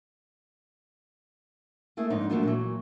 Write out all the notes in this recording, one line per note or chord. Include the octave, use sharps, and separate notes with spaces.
A3 A#3 E4 G#4
F2 G#2 D4 D#4
F3 F#3 A3 A#3 D4 F4
A#2 E3 F#3